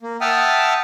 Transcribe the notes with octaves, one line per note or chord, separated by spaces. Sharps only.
A#3
E5 F#5 G5 A5 D#6 F6